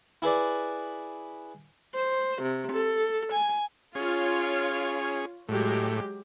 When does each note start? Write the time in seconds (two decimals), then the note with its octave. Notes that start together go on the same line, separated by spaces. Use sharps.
0.22 E4 G#4 B4 D5
1.94 C5
2.42 C3
2.71 A4
3.32 G#5
3.95 C#4 F4 G#4 C#5
5.49 A2 F#3 G#3 G4